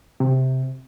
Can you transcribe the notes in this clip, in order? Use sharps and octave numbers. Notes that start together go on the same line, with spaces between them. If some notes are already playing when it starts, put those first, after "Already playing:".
C3